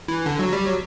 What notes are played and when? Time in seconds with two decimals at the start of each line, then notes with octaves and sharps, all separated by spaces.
0.08 E3
0.26 D3
0.39 F#3
0.53 G3
0.66 F#3